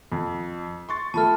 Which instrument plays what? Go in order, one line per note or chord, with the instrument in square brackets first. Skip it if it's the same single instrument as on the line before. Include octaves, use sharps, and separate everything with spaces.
[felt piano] F2
C6 C#6 A6
[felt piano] F3 A3 [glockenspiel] A5 B5 F6